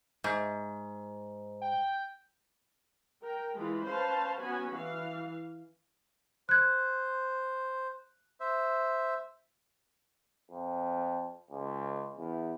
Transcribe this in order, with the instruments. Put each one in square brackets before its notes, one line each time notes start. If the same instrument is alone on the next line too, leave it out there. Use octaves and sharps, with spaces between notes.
[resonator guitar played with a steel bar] G#2
[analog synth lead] G5
[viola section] A#4 G5
E3 G#3 F4 B5
C#4 B4 C5 F5 A5
B3 C#4 F#4 G#5 B5
E3 F5
[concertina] C5 [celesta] F#6 G#6
[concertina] C5 E5
[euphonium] F2
C#2
E2